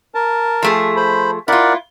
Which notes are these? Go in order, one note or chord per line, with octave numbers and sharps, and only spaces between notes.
A#4 A5
F3 A3 G#4
C5 B5
E4 F4 A#4 D5 F#5